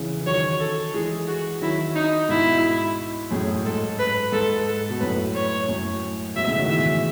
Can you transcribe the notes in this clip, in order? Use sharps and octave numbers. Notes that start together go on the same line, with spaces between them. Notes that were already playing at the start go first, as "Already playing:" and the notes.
Already playing: C#3 E3
E3
D#3 F#3 C#5
A4
E3 G#3 G#4
F#4
D#3 F#3 E4
D#4
G#2 B2 E4
F#2 A2 G#4
G#2 A4
B4
G#2 A4
A4
B2
F#2 A2 B4
C#5
F#2 A2
G#2 B2 E5
A2 C#3
B2 D#3
E3 G#3 E5